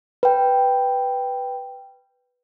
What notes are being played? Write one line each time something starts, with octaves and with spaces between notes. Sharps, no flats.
B4 G5